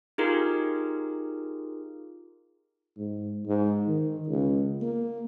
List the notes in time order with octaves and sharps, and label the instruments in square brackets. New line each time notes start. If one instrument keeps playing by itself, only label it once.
[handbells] D#4 F4 G4 G#4 A#4
[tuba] G#2
G#2
D#3
C#2
A#3